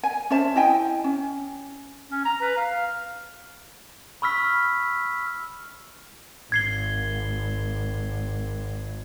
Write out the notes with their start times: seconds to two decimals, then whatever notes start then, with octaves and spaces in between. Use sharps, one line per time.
0.03 G#5
0.30 C#4 C5 E5 A5
0.56 E4 D#5 G5 G#5
1.04 C#4
2.11 C#4
2.25 A#5
2.41 B4
2.57 F5
4.22 B5 C#6 E6 F6 B6
6.52 G#1 G#6 C7 G7